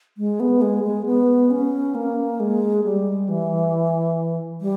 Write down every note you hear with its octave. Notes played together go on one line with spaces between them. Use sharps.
G#3
B3
G#3
G#3
B3
C#4
A#3
G#3
G3
E3
G3